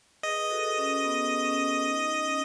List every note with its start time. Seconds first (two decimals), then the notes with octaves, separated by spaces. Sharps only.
0.23 G#4 B4 D#5
0.50 F#4 A4
0.78 C#4
1.04 B3
1.45 C#4
1.86 D#4
2.26 C#4